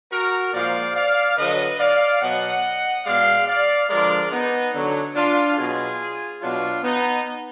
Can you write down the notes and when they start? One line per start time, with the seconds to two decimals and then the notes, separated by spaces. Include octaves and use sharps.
0.11 F#4 A#4
0.54 A#2 F3 G#3 D5 F5
0.95 D5 F5
1.37 D3 F#3 B4 D#5
1.79 D5 F5
2.21 B2 F#3 D#5 F#5
3.05 B2 G#3 D5 F5
3.47 D5 F5
3.89 D3 F3 G#3 A#4 D5
4.32 B3 D#4
4.73 D3 F#3
5.15 D4 F4
5.57 B2 F#3 F4 G#4
6.41 B2 F#3 D4 F4
6.83 B3 D#4